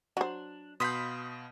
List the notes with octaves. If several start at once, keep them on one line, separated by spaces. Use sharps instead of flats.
F#3 D4 C5
B2 F5 B5 C6 D#6 G6 B6